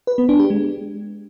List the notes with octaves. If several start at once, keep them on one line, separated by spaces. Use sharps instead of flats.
B4
B3
D4
G4
G#3